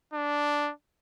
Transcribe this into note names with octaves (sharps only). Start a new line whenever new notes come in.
D4